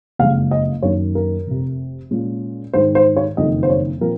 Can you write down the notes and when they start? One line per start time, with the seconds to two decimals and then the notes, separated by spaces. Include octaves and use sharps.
0.19 F#1 F2 C#3 G#3 F5
0.51 D#5
0.82 F#2 D#3 A#3 D#4 C#5
1.15 A#4
1.47 F1 F2 C3
2.11 A#2 G#3 C#4 F4
2.73 G#2 D#3 G#3 C5
2.95 C5
3.17 C#5
3.37 F#1 F2 D#3 D#5
3.63 C5
3.69 C#5
4.01 A#2 F3 C4 F4 A#4